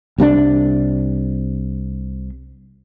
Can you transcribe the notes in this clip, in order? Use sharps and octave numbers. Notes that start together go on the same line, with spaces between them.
C2 C3 E3 D4